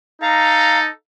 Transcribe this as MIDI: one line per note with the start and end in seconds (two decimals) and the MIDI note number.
0.22 0.89 63
0.22 0.89 69
0.22 0.78 77
0.22 0.78 82